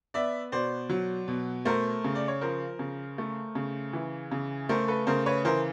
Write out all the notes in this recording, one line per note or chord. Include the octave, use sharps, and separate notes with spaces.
B3 D5 E5
B2 C5 D5
F#3
B2
A3 A#4 C5
C#3
D5
C#5
F3 A#4 C5
C#3
A3
C#3
E3
C#3
A3 A#4 C5
A4 B4
C#3 A#4 C5
B4 C#5
E3 A#4 C5